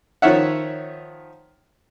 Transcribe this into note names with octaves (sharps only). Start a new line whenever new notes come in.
D#3 F3 C#5 E5 F#5